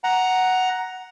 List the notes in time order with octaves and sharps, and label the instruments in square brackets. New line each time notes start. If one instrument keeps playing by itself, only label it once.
[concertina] F#5 A#5